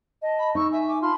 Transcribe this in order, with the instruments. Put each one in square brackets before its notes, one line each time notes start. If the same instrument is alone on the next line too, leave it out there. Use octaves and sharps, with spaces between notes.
[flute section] D#5 A5
[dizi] B5
[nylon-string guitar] D#4 [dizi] C#6 [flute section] E6
[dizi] E5 [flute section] G#5
[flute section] G#5 C#6 D6
[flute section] F4 A5 B5 [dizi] C6